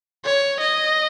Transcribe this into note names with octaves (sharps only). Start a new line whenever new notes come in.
C#5
D#5